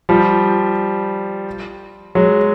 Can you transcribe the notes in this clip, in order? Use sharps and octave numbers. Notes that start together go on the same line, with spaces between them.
F3 G3
F#3 G#3